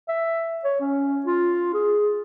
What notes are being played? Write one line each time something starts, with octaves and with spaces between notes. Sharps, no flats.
E5
C#5
C#4
F4
G#4